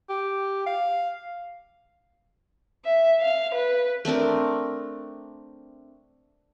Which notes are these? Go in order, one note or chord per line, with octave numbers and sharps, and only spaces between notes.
G4
F5
E5
F5
B4
A3 C4 D4 A#4